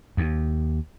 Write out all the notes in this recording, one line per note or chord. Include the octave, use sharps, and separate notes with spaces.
D#2